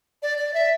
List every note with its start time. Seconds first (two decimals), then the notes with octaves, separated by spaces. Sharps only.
0.22 D5
0.38 D5
0.54 E5